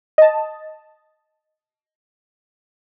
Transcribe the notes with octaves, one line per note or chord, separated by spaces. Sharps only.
D#5 A5